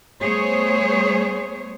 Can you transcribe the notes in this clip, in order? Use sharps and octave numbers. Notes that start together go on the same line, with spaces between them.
G3 A3 B3 G#4 C5 C#5